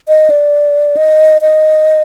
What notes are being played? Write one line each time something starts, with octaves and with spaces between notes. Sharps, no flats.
D#5
D5
D#5
D#5